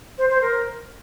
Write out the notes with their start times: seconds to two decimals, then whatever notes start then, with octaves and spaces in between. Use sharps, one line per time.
0.18 C5
0.30 C5
0.42 A#4